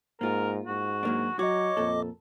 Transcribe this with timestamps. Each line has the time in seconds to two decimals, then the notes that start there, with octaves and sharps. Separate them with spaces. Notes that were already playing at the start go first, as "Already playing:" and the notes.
0.21 G#2 A#3 F4 A#4
0.67 G#2 F#4
1.03 F#3 A#3 D4
1.39 F#3 F#4 C#5 D#5 D6
1.77 F2 A#2 A4